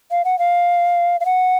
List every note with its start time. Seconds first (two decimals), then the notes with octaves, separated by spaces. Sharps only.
0.11 F5
0.25 F#5
0.39 F5
1.20 F5
1.25 F#5